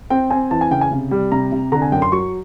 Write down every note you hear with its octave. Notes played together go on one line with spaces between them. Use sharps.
C4 G5
C4 G#5
E3 A5
G#5
C#3 G5
G#5
C3
G3
C3 A#5
C3
D3 A#5
G#5
F#2 G5
C6
F#3 C#6